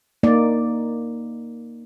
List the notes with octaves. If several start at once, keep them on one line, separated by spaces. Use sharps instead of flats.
A#3 D#4 D5